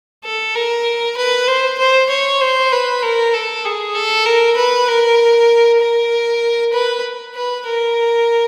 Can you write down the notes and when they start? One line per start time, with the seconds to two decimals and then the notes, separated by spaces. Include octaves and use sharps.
0.24 A4
0.55 A#4
1.17 B4
1.48 C5
1.78 C5
2.10 C#5
2.41 C5
2.72 B4
3.03 A#4
3.34 A4
3.65 G#4
3.95 A4
4.26 A#4
4.56 B4
4.88 A#4
5.80 A#4
6.73 B4
7.35 B4
7.66 A#4